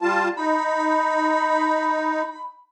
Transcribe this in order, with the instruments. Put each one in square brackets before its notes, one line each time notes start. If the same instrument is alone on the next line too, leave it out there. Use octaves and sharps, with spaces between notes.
[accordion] G3 F4 A5
[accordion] D#4 [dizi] B5